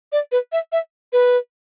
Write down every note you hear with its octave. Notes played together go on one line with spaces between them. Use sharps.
D5
B4
E5
E5
B4